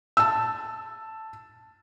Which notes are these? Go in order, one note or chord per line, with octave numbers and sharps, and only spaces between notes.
A5 E6